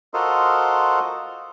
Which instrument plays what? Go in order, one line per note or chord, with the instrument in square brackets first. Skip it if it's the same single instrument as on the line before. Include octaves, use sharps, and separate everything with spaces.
[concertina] F4 F#4 A4 A#4 C5 D#5